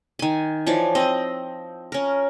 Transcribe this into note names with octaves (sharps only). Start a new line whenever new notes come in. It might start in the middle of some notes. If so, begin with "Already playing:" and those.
D#3 G#5
E3 F3 C#5 D5
C4 D#5
C#4 A#4